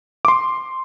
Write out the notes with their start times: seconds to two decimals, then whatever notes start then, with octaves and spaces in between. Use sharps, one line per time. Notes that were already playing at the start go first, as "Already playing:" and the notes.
0.25 D6
0.28 C6